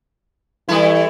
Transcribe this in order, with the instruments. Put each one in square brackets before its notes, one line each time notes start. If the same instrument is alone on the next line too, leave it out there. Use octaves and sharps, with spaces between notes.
[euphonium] E3 [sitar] G3 A3 E4